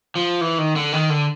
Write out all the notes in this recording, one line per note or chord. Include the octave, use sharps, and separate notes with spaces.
F3
E3
D#3
D3
D#3
D3